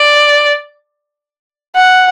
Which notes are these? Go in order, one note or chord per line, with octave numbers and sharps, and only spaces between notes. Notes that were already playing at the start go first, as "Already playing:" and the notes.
Already playing: D5
F#5